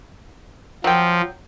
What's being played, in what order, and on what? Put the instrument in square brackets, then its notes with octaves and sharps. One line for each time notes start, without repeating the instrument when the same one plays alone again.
[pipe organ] F3 [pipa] F#3 G5